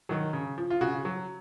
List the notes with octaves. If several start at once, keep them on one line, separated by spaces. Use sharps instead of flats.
D#3 F#3
C#3
F3
F4
C#3 F#4
F#3